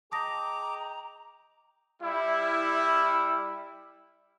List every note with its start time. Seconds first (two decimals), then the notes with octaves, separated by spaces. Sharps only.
0.12 G#4 D#5 G5 A5 A#5 D6 D#6 A#6
2.02 G3 E4